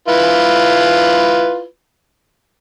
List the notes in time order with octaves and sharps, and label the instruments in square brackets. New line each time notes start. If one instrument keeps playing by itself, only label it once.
[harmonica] E4 F4 B4